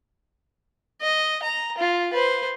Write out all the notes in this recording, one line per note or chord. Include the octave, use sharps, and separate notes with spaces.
D#5
A#5
F4
B4 C5